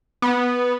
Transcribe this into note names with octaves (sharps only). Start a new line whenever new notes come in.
B3